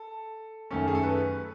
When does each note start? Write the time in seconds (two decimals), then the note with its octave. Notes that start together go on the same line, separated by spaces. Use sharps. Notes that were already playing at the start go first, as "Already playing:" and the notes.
Already playing: A4
0.71 F#2 D#3 A3 C#4 A4
0.88 G#4
0.95 A4
1.03 B4